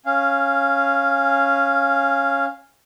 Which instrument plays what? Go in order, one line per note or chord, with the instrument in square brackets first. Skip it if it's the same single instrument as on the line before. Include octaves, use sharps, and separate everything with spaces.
[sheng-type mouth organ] C#4 F5